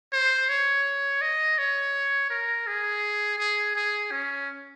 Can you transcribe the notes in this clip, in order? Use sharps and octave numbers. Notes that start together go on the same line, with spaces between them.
C5
C#5
D#5
C#5
A#4
G#4
G#4
G#4
C#4